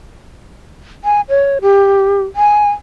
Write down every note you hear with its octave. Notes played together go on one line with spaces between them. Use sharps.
G#5
C#5
G4
G#5